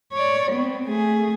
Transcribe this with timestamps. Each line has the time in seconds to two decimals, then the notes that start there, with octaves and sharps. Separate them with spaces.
0.13 C#5 D5
0.52 B3 C4
0.85 A3 G#4